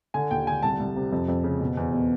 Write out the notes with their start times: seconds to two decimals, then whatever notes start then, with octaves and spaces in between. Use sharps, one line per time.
0.14 D3 G#5
0.31 D#2 G5
0.47 D3 G#5
0.63 C2 A5
0.80 C2
0.96 C3
1.12 F2
1.28 F2
1.44 C#3
1.60 B2
1.77 E2
1.94 B2